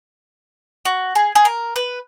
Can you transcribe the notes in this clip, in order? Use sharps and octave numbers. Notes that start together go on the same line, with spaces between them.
F#4
G#4
G#4
A#4
B4